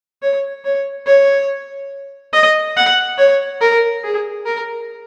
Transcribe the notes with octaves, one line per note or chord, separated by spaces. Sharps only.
C#5
C#5
C#5
D#5
F#5
C#5
A#4
G#4
A#4